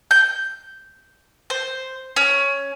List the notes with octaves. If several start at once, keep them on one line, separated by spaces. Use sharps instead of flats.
G6
C5
C#4